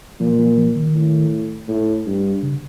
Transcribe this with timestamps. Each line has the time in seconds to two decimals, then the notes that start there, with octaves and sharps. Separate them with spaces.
0.20 A#2 F3
0.38 F3
0.57 F3
0.76 D#3
0.95 A2
1.68 A2
2.07 G2
2.43 C#3